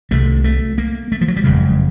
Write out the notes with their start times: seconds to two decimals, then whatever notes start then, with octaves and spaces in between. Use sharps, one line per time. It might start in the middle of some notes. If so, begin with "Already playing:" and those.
0.11 C2 C3 A3
0.44 A3
0.78 A#3
1.12 A3
1.21 F3
1.28 F#3
1.36 G3
1.44 F#1 F2 C#3 G#3